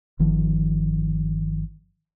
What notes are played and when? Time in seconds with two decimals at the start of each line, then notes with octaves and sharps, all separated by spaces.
0.19 G1 D#3 F3